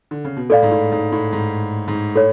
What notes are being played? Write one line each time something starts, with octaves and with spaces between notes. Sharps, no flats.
D3
C#3
B2
A2 A4 D5 F5
G#2
A2
G#2
A2
G#2
G#2
A2 A4 C#5